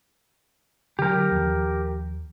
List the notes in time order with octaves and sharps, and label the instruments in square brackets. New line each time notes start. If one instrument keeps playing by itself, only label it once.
[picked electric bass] D3 E3 F#3 [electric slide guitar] G4 A#4
[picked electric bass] D#2 F3